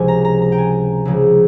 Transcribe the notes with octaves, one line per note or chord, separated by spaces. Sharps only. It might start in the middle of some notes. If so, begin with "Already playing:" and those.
Already playing: C#2 C3 F3 G#3 G#5
A#5
A#5
A#5
G5
G#5
C#2 C#3 F3 G#3